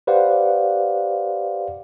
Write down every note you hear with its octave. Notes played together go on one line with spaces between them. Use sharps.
G4 B4 C5 D5 F5 F#5